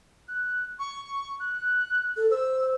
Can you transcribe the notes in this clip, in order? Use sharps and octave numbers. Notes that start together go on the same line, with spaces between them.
F#6
C#6
F#6
A4
C5 E6